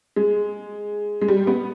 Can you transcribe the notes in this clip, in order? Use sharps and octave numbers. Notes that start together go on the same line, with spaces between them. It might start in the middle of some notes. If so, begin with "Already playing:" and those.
G#3
G#3
G3
B3